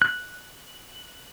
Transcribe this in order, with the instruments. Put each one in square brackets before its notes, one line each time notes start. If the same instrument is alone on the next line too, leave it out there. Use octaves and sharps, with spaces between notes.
[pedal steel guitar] F#6